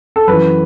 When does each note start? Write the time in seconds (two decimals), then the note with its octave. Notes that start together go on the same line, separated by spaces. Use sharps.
0.16 A4
0.27 F#2 E3 B4